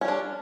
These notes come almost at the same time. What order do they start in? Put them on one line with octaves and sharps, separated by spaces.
C#4 G3 D4